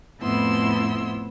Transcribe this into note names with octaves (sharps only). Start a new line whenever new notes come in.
F2 A2 B3 E4 C6 E6